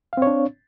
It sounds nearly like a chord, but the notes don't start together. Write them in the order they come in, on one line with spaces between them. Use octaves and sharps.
F5 C4 C#5 D4